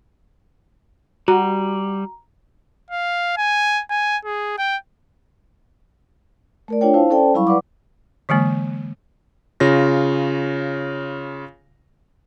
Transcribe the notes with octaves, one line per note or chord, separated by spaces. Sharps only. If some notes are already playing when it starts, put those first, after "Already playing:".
G3 F#4 A#5
F5
G#5
G#5
G#4
G5
A3 A#4 D5
D4 F4 C#5 G5
E4 C5 F5 A5
C#4 A4 C5 D5 G5 A5
F#3 G3 E4 F5 B5 C#6
B4 D5 F#5 D6
D3 E3 G#3 A#3
C#3 F4 C#5 A#6